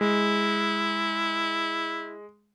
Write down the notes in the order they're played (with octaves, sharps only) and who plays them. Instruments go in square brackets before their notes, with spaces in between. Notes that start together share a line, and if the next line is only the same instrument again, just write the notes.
[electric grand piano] G#3 [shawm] E4